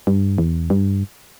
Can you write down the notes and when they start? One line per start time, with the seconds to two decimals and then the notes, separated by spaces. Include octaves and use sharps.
0.07 G2
0.38 E2
0.70 G2